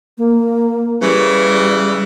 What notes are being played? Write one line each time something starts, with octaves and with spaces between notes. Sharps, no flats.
A#3
C#3 E3 G3